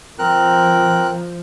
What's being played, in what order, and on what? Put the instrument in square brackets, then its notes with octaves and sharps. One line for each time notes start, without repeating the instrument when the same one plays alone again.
[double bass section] F3 [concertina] C4 A#4 F#6